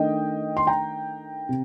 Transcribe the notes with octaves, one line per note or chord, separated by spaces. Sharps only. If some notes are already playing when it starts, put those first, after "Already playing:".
Already playing: D#3 A3 D4 D#5 G5
C6
G5 A#5
C3